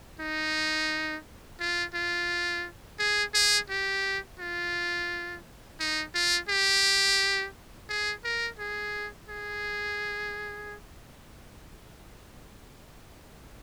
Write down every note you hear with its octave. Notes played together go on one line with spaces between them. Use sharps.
D#4
F4
F4
G#4
G#4
G4
F4
D#4
F4
G4
G#4
A#4
G#4
G#4